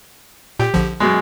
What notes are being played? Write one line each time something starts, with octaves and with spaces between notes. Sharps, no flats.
A#2 G4 G5
A#1 D3 F3
F#2 B2 G#3